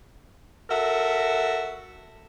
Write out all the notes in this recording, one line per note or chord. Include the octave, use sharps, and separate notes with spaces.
F#4 A4 A#4 E5